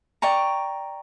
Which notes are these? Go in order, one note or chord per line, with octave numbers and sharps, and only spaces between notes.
D5 G5 A#5 C#6